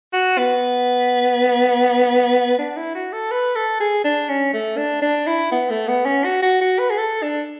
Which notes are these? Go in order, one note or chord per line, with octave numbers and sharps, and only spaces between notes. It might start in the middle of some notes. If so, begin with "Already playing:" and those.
F#4
B3
D4
E4
F#4
A4
B4
A4
G#4
D4
C#4
A3
D4
D4
E4
B3
A3
B3
C#4
F#4
F#4
F#4
B4
G#4
A4
D4